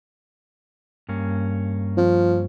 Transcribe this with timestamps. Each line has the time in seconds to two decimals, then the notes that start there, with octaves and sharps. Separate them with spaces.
1.09 G2 A#3 C#4
1.97 F3